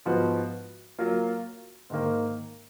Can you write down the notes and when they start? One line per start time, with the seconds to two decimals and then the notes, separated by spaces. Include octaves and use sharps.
0.06 G#2 F3 B3 F#4
0.99 F#3 A#3 F4
1.90 G#2 D#3 A#3